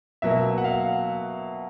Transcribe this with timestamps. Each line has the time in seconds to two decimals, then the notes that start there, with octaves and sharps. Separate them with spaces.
0.22 B2 F#3 A#3 E5
0.58 F#5
0.64 F5